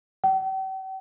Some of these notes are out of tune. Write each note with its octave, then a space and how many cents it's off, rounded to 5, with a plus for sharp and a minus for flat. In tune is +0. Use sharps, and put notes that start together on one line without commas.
G5 -45